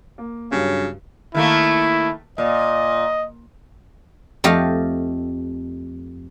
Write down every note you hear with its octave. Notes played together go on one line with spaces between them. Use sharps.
A#3
G2 C#3 F#3
D#3 A3 A#3 E4
A#2 D#5
F2 A3 G4 D#5 F5